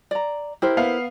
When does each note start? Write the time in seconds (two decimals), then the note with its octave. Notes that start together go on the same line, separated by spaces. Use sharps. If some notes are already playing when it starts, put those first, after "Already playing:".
0.11 D5 A#5
0.62 E4 G4 A#4 C5
0.77 B3 F5